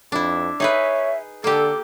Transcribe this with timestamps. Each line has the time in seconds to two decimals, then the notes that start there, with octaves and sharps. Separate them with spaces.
0.12 F2 D4 E4
0.60 D#4 G#4 B4 C#5 E5
1.44 D3 A#3 G4 A4